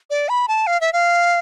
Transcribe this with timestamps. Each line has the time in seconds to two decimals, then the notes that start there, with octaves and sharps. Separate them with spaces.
0.10 D5
0.29 B5
0.48 A5
0.67 F5
0.81 E5
0.93 F5